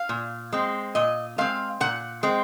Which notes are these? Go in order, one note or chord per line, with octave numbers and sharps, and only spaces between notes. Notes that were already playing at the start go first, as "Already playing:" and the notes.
Already playing: F5
A#2
G#3 C4
A#2 D#5
G#3 C4 F5
A#2 F#5
G#3 C4